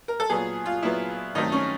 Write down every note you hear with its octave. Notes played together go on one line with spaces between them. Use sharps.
A#4
A4
A#2 F#3 B3 G#4
F4
A#2 F#3 B3 E4
G2 D#3 F#3 A3 C4 D#4
C#4